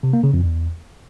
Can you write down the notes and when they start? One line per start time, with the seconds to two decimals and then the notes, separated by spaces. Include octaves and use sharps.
0.03 C3
0.13 A#3
0.23 C#3
0.33 F2
0.43 E2